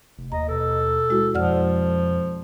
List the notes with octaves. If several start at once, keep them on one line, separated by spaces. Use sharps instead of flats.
F1
D#2 D#5 A#5
B2 A4
G#3 E4 F#4
F2 F3 D5 F#5 F6